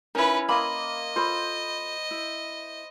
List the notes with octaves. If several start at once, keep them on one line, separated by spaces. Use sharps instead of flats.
C#4 D#4 E4 A#4 B4
A#3 D#5 B5 C6 D#6
F4 A4 C5 B5
E4